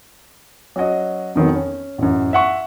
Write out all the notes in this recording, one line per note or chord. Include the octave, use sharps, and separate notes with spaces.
F#3 C#4 F#4 D#5
F2 D#3 F#3 B3
C#4
A1 F#2
E5 F#5 C#6